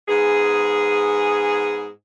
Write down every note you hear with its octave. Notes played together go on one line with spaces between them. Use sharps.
G#2 B3 G#4